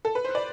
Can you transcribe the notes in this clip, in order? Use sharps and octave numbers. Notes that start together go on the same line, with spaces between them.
A4
B4
C5
D5